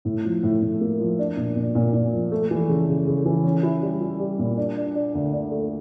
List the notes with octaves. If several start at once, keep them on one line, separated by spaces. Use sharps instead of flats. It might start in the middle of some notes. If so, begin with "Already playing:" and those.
A2
F3
A2
A2
A#3
F3
D4
A#2
A#2
A#2
A#2
F3
A3
E3
C#3
C#3
C#3
E3
C#4
E4
G3
E4
G3
A#2
D4
D4
D4
D2
D4
A3